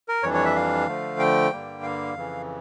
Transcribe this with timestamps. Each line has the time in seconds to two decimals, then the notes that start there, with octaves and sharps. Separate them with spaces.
0.08 A#4
0.23 F2 E3 G3 D4 C#5
0.34 C#5
0.45 E5
0.56 F5
0.87 D3 F3 A3
1.19 G5
1.51 G2 D3 G3 A#3
1.83 F5
2.15 F2 C#3 E3